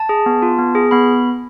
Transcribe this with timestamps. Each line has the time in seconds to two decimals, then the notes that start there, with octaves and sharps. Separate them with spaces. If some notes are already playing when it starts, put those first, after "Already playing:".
Already playing: A5
0.09 G#4
0.26 B3
0.42 F4
0.59 B3
0.75 G#4
0.91 B3 B5